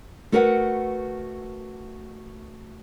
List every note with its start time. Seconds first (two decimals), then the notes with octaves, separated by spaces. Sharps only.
0.32 A3 F#4 A#4 B4 F5 F#5